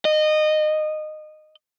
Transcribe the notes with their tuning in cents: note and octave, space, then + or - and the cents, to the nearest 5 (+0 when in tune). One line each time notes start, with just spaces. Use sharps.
D#5 -20